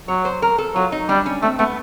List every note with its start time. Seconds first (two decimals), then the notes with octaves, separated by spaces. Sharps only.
0.08 F#3 C#5
0.25 C5
0.42 A#4
0.58 A4
0.75 F#3 F4
0.92 D#4
1.09 G3 D4
1.26 C#4
1.42 A3 C4
1.59 A3 B3